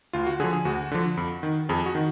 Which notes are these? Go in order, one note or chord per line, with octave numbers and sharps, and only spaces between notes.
D2 F4
F#4
D3 F3 G#4
G#4
D2 F#4
D3 F3
F2
D#3
F2 G#4
F#4
D#3